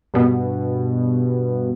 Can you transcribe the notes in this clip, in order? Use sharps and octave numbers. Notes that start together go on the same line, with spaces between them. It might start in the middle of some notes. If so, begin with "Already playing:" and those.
G2 B2 B3